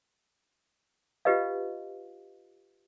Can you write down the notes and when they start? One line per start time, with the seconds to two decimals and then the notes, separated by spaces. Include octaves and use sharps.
1.25 F4 G4 B4 D#5 F5